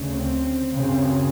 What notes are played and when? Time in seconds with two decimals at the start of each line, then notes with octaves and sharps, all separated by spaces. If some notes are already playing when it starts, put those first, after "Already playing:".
Already playing: D2 C#3
0.10 C4
0.71 F#2 C#3 C4